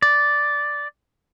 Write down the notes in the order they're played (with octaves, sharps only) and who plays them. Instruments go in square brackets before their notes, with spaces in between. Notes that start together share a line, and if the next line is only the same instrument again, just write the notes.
[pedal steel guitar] D5